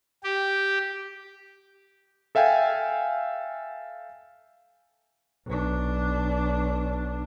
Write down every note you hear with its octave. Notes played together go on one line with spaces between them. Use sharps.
G4
A4 E5 F5 G5 G#5
B1 D4